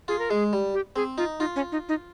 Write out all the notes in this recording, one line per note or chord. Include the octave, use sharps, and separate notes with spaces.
F4 G#4
A#4
G#3 G#4
G3
G4
C4 G#4
D#4 F4
D#4 F4
C#4
D#4
D#4